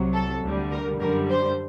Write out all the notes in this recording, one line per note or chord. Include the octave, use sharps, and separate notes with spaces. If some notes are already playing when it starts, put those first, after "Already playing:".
Already playing: C2 C3 F#3
A4
D2 D3 G3
A#4
F#2 D3 G3 A#4
C5